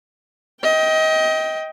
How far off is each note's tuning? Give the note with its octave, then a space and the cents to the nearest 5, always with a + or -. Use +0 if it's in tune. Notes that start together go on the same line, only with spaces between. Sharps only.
D#5 +25 G5 +0